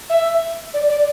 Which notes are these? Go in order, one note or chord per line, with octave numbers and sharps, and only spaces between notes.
E5
D5
D5